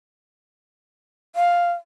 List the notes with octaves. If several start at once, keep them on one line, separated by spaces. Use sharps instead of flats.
F5